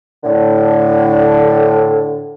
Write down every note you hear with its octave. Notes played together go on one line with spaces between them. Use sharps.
A2 D3